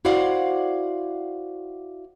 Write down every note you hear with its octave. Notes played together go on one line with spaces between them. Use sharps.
E4 F#4 C5 D5 F5 F#5